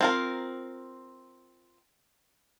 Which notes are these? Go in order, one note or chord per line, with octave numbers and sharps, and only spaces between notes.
C4 F4 A#4